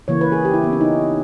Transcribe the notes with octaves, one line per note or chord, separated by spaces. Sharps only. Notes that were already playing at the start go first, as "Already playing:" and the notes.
C#3 E3 A#3 C#5
B4
G#4
G4
E4
B3
C#4
D#4